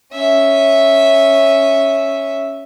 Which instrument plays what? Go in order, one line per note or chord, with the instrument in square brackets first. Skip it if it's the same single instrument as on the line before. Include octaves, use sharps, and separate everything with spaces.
[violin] C#4 E5